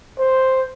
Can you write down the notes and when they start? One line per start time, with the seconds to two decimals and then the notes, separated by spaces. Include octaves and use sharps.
0.19 C5